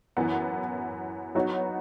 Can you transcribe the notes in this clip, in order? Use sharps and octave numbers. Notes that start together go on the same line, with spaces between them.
F#2 E3 B3
F#3 B3 D#4 F#4 C#5